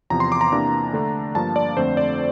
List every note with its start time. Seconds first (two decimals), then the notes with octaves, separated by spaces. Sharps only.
0.10 E2 C3 F3 A#5
0.20 C6
0.32 D6
0.41 A#5
0.52 C3 E3 A#3 D4
0.93 D3 A3 D4
1.35 G2 F3 A#3 A5
1.56 D5
1.77 F2 D3 A3 C4 C5
1.97 D5